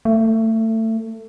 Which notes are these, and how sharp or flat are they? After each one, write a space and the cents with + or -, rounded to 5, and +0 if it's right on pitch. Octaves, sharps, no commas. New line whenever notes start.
A3 +25